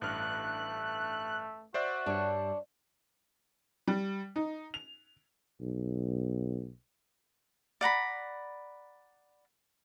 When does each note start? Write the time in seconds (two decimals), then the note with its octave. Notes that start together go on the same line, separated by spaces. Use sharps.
0.01 A1 G2 A3 F6 F#6
1.74 F#4 C5 D5 E5
2.06 G2 D4 C#5
3.87 G3
4.36 D#4
4.74 F7
5.61 B1
7.81 D5 F#5 A#5 B5